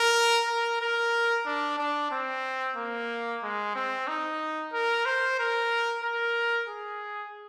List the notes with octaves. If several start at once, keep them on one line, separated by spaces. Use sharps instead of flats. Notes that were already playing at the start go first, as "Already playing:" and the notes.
Already playing: A#4
A#4
A#4
D4
D4
C4
A#3
G#3
C4
D#4
A#4
C5
A#4
A#4
G#4